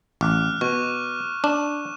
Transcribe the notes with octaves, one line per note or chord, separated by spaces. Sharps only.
A1 D6 F6 F#6
B2 C#6 D#7
D4 E7